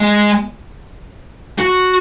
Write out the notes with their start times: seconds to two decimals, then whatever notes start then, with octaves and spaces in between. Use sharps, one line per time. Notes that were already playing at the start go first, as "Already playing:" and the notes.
Already playing: G#3
1.58 F#4